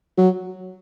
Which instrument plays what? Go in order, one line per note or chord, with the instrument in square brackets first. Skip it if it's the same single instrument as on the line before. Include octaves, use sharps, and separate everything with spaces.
[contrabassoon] F#3